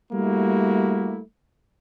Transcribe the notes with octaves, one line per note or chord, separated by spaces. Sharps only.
G3 A3 A#3 E4 F#4